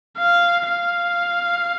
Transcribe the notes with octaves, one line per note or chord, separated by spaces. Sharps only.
F5
F5